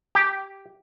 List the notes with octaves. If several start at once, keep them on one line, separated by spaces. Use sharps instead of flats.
G4